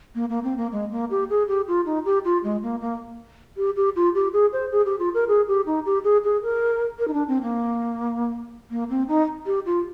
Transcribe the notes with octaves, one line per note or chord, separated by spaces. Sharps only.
A#3
A#3
C4
A#3
G#3
A#3
G4
G#4
G4
F4
D#4
G4
F4
G#3
A#3
A#3
G4
G4
F4
G4
G#4
C5
G#4
G4
F4
A#4
G#4
G4
D#4
G4
G#4
G#4
A#4
A#4
D#4
D4
C4
A#3
A#3
C4
D#4
G4
F4